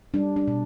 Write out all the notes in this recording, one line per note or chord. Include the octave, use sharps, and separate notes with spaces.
G3 D4
D4
B2